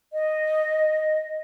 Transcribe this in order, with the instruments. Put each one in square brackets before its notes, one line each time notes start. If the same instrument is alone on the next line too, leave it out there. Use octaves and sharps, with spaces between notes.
[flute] D#5